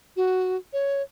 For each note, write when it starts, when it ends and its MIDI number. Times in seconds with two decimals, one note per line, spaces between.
0.16 0.56 66
0.73 1.02 73